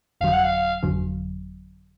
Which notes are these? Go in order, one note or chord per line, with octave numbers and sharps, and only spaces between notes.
G1 F2 D3 F#3 F5
F#5
F5
G1 F2 D3 F#3